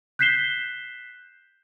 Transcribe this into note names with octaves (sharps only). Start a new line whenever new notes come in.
F#6 G6 B6 C7 E7 G7